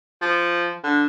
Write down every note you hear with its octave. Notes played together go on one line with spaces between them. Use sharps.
F3
D3